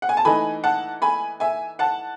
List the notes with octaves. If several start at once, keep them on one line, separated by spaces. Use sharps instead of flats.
F#5
G#5
A5
E3 A3 D#4 G#5 B5
F#5 A5
G#5 B5
E5 G#5
F#5 A5